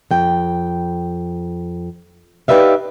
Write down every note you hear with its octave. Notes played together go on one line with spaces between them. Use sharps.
F2 G5
D#4 G4 B4 D5 E5 F5